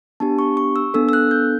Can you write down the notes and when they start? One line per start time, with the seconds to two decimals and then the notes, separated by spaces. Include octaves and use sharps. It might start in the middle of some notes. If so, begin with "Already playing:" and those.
0.20 B3 D4 G4 A5
0.39 C#6
0.57 C#6
0.76 E6
0.94 B3 D4 A4 E6
1.09 E6
1.13 F#6
1.31 G6